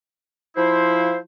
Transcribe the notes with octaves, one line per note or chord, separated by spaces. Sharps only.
F3 E4 C5